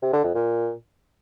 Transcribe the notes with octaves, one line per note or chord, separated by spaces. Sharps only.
C3
D3
F2
A#2